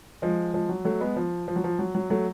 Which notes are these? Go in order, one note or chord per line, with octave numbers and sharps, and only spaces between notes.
F3 G#3
F3 G#3
F#3
F#3 A3
G#3 B3
F3
F3
F#3
F3
F#3
F#3
F#3 A3